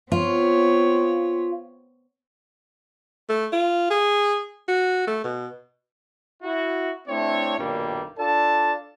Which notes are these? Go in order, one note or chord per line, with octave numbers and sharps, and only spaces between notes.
B3 C4 F4 C#5
A3
F4
G#4
F#4
A3
B2
E4 F#4
A3 C4 D4 E4 C#5
B1 G2 A#2 D#3 G3 A#3
D4 F4 A4 D5 A5